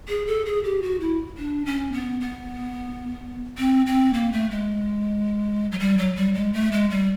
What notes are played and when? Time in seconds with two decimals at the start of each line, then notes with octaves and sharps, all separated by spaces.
0.09 G#4
0.27 A4
0.46 G#4
0.64 G4
0.82 F#4
1.00 E4
1.38 D4
1.65 C#4
1.92 B3
2.20 B3
3.58 C4
3.86 C4
4.13 A#3
4.32 A3
4.51 G#3
5.72 F#3
5.79 G3
5.98 F#3
6.16 G3
6.34 G#3
6.53 A3
6.72 G#3
6.90 G3